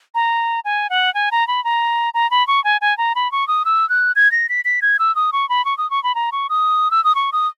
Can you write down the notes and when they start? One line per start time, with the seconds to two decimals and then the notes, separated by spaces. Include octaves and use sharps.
0.15 A#5
0.65 G#5
0.90 F#5
1.14 G#5
1.32 A#5
1.48 B5
1.64 A#5
2.14 A#5
2.31 B5
2.47 C#6
2.64 G#5
2.81 G#5
2.98 A#5
3.15 B5
3.32 C#6
3.48 D#6
3.65 E6
3.89 F#6
4.16 G#6
4.32 A#6
4.49 B6
4.65 B6
4.82 G#6
4.99 E6
5.16 D#6
5.33 C#6
5.49 B5
5.65 C#6
5.78 D#6
5.91 C#6
6.04 B5
6.15 A#5
6.32 C#6
6.50 D#6
6.91 E6
7.04 D#6
7.15 C#6
7.33 D#6